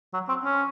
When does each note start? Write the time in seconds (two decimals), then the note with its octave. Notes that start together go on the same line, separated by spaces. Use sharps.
0.13 F#3
0.29 C4
0.44 C#4